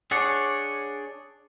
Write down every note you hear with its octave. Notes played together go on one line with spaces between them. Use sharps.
D4 G#4 C#5 D5 F#5